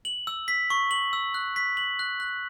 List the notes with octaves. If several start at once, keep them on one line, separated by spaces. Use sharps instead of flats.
F#7
E6
B6
C#6
F#7
E6
F#6
B6
F#7
F#6
F#6